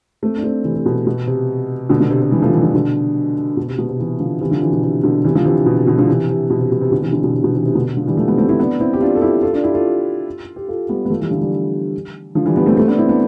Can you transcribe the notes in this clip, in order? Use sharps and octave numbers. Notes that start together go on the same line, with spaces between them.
A3 C4
D4
A3 C4
C3 E3
C3
B2
B2
C3
B2 D3
B2 D3
C3
C3
E3 G3
F3 A3
E3 G3
D3 F3
B2 D3
B2
C3
B2
C3
C3 E3
D3 F3
C3 E3
D3 F3
C3 E3
B2
C3
B2 D3
C3 E3
D3 F3
C3 E3
B2
C3
B2 D3
D3 F3
C3 E3
C3
B2
C3
B2
C3
B2 D3
C3 E3
B2 D3
B2
C3
B2 D3
C3 E3
C3 E3
B2 D3
D3 F3
E3 G3
F3 A3
G3 B3
A3 C4
C4 E4
B3 D4
C4 E4
G4
D4 F4
A4
E4 G4
F4 A4
D4 F4
E4 G4
F4 A4
G4
F4 A4
G3 B3
B3
F3 A3
E3 G3
D3 F3
E3 G3
D3 F3
E3 G3
G3 B3
A3 C4
A3 C4
B3 D4
C4 E4
B3 D4